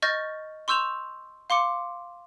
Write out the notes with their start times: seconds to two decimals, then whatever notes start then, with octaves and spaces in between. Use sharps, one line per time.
0.02 D#5 C#6 F6 G6 A6 A#6
0.68 C6 C#6 E6 G6 E7 F7
1.50 F5 C6 D6 C#7